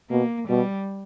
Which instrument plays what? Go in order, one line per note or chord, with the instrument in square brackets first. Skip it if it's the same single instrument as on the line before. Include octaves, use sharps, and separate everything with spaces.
[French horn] B2 [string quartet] A#3
[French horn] B2 [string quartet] G3